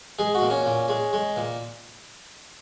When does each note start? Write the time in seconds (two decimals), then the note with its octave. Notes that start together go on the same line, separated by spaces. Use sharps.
0.19 G#3 G#4
0.35 F#4
0.42 A#2
0.50 C#4
0.66 A#2
0.89 G#3
1.13 G#3
1.36 A#2